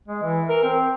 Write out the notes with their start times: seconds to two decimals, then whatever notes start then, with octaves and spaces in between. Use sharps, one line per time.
0.08 G#3
0.23 E3
0.49 A#4
0.63 C4